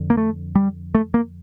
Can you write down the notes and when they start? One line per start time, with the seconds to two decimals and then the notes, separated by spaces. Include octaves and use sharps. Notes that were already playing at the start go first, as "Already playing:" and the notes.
Already playing: F2 D3
0.10 A#3
0.17 A3
0.55 G3
0.95 A3
1.14 A#3